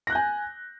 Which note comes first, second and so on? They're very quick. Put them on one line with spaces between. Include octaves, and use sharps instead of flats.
A#6 F#6 G6 G#5